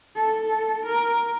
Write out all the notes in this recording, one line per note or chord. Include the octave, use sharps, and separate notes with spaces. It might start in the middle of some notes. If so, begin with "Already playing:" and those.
A4
A#4